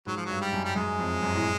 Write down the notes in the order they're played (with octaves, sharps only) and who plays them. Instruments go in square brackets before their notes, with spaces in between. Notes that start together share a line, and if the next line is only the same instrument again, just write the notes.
[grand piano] G#2 [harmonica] F#3
[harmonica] F3
[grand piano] G2 [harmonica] F#3
[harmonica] G3
[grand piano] F#2
[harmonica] G3
[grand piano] F#2 [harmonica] G#3
[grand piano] F2
F#2
A2